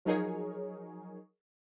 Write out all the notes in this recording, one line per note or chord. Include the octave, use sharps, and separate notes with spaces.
F3 F#3 D#4 G#4 A#4 C#5